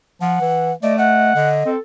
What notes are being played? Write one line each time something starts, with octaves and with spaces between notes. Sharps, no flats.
F3 F#5
E3
A3 D5 D#5
D#5 F#5
D3 D#5
C4 A4